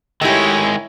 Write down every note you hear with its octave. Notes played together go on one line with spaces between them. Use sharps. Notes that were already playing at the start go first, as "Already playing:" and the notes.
D#3 G#3 A3 D#4 E4 G4 C#5